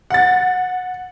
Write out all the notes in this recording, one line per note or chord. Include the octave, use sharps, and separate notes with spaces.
F#5 A6